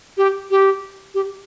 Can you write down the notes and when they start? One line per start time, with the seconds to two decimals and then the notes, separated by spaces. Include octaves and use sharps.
0.17 G4
0.51 G4
1.14 G4